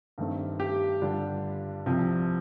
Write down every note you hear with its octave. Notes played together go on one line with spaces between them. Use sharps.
G2 D#3 A3 C4
G4
G2 D3 G3 D4 F4
C2 C3 F3